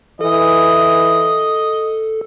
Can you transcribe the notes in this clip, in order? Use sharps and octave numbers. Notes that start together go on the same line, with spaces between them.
E3 A4 D#5